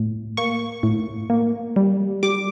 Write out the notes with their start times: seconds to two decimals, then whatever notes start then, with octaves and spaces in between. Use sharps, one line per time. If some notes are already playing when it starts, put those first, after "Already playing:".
Already playing: A2
0.37 A#3 C#6
0.83 A2
1.30 A#3
1.76 G3
2.23 G3 D6